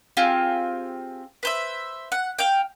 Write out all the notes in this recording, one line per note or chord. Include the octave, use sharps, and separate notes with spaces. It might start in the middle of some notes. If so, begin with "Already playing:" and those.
C4 F4 G4 G#4
B4 C5 E5
F#5
F5 G5